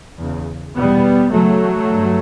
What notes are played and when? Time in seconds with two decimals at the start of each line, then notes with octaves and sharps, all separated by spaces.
0.18 E2 C#3
0.75 E2 B2 G3 B3
1.32 E2 C#3 F#3 A3
1.90 G2